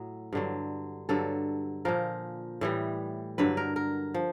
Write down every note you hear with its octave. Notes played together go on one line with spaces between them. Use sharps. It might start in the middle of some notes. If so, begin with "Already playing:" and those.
Already playing: A2 F#3
G2 D3 F#3
G2 D3 F#3 A4
A#2 F3 A#4
A2 E3 G3
G2 D3 F#3 B4
A#4
A#4
F3